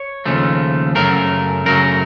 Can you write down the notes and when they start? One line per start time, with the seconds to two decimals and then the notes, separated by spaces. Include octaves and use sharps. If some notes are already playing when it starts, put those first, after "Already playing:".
Already playing: C#5
0.26 D#2 C#3 F3 A3
0.95 F#2 C#3 F#3 A3 A#4
1.65 F#2 C#3 F#3 A3 A#4